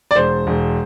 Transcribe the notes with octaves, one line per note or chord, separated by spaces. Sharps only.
D5
E1 C5
E1